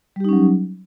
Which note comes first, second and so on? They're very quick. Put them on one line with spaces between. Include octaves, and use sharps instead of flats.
G3 G4 D#4 C#4 F#3